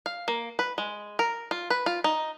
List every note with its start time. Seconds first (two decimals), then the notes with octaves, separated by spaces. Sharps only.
0.06 F5
0.28 A#3
0.59 B4
0.78 G#3
1.19 A#4
1.51 F4
1.70 B4
1.86 F4
2.04 D#4